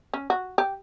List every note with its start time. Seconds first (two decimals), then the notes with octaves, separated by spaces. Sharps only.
0.14 C#4
0.30 F#4
0.58 G4